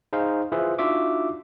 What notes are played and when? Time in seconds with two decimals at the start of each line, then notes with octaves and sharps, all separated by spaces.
0.13 D#4 G#4 C5 F5
0.52 E4 F4 G#4 B4 C5 E5
0.79 D4 D#4 F4 F#4 E5 D6